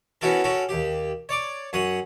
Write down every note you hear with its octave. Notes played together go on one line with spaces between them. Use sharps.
B3 C#4 E4 F#4 A4 A#4
C#4 F#4 A4 A#4
D#2 G4
C#5 D5 D6
F#2 C#5 F#5 D#6